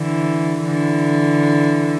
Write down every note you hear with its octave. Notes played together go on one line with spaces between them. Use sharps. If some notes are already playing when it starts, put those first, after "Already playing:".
Already playing: D3 E3
D3 E3